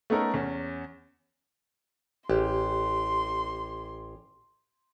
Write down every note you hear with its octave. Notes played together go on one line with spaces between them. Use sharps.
A3 B3 C#4 D#4 A4 A#4
E2 C#4
A1 G4 G#4 C6